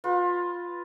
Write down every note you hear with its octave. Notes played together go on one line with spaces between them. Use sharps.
F4 B4